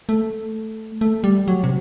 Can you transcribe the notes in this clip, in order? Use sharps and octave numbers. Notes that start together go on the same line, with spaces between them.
A3
A3
G3
F#3
C3